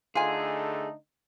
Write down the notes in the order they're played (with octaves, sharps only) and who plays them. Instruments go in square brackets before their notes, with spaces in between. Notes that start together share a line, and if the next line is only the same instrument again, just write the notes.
[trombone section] D3 A3 D#4 [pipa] F4 G#5 [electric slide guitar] G#4